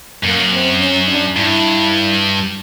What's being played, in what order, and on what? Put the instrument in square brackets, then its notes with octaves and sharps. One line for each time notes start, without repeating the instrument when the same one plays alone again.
[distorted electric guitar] F#2 [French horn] A#3
[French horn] C4
C#4
D4
[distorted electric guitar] G2 [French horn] E4